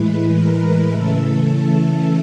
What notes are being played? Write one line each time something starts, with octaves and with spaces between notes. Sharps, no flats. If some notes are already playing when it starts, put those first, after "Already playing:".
Already playing: A2 E3 G#3 B4
A#4
C#3 E3 A3 A4